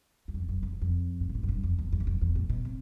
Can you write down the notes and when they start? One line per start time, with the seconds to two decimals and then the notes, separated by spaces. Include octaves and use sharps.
0.28 E2
0.34 F2
0.49 F#2
0.63 F2
0.73 E2
0.82 F2
1.21 G#2
1.29 A#2
1.35 A2
1.43 F#2
1.49 G2
1.63 F2
1.79 E2
1.92 F2
2.00 F#2
2.07 F2
2.21 E2
2.35 A2
2.50 B2
2.65 C3